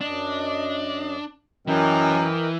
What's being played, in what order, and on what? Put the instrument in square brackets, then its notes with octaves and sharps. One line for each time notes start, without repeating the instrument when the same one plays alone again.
[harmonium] F#2 D#5 [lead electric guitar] D4
[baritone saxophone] F#2 [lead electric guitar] E3 [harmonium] A#4 D#5 G5